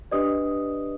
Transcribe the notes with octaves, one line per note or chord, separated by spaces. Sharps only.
D4 G4 B4 D5 D#5 D#6